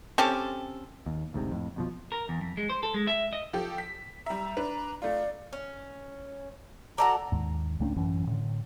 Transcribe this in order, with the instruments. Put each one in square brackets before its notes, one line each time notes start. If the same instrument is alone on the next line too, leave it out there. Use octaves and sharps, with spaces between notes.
[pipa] C4 C#4 G4 A4
[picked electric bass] D#2
G1 D2 G#2 C3
F2 A2
F2 B2 F3
[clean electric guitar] A#4
E2
F2
G#3
C5
A4
G#3
E5
D#5
[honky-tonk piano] F3 G4 A4
B6
[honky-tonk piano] G3 E5 [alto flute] A#5
[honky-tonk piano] D4 B4
[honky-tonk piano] A3 F4 [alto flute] D5
[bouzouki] C#4
[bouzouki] F#4 A4 D5 [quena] A#5
[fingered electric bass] D#2 G#2
C#2 A3 C#4 D4
A1 F#2 E3 C#4
A2 D3